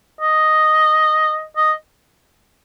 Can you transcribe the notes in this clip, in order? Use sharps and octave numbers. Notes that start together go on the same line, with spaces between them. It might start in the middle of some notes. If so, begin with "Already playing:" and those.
D#5
D#5